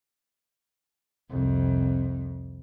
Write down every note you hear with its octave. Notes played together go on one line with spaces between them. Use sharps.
C2 F2